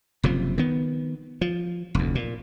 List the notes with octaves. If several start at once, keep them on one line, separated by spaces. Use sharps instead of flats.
F#1 C3 F3
D#3 B3
F3
F1 D2
A#2